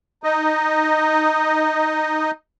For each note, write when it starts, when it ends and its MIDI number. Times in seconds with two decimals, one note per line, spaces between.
0.23 2.31 63
0.23 2.31 75